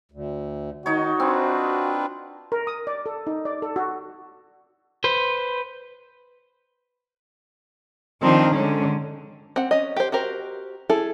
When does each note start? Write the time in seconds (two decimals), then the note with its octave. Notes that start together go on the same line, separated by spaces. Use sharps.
0.12 D2
0.86 D#3 D#4 F#4 C#5
1.20 C4 D4 F4 B4
2.52 A#4
2.67 D#6
2.87 D5
3.06 A4
3.27 D#4
3.45 D5
3.62 A4
3.76 F#4
5.04 B4 C5
8.21 D#3 F3 C4 D4 D#4
8.55 D3 G#3 C#4
9.56 C4 F#5
9.71 C#4 D#5
9.96 G4 C5
10.12 F#4 G4 A#4 C5
10.89 E4 G#4 A4